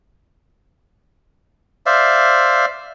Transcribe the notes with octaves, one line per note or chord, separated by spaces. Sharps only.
C5 D5 E5 F5